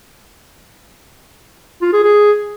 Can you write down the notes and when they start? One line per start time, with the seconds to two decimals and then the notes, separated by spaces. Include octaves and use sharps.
1.82 F4
1.93 G#4
2.04 G#4